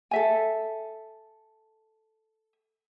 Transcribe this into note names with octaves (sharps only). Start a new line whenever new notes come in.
A4 E5 G#5